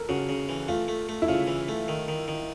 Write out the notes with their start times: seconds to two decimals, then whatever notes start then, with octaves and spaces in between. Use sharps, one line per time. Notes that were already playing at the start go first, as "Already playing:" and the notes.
Already playing: A4 A#4
0.09 C#3 F#4
0.29 C#3
0.49 E3
0.68 A3 F4
0.88 A3
1.09 A3
1.22 E4
1.28 C#3 F4
1.47 E3
1.68 A3
1.88 D#3
2.08 D#3
2.28 D#3